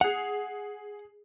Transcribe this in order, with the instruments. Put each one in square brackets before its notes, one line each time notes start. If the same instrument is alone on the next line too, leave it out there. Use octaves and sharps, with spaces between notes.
[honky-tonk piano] G#4 F7 [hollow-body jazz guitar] F#5